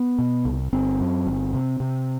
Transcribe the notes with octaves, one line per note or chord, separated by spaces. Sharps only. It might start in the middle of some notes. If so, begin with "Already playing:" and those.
Already playing: B3
B2
C2
G1 C4
F#2
G1
C3
C3